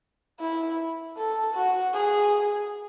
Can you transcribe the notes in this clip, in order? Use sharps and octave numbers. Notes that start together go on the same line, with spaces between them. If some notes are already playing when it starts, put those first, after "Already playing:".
E4
A4
F#4
G#4